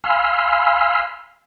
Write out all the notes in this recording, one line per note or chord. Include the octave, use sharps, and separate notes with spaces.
F5 G#5 B5 C6 E6 F6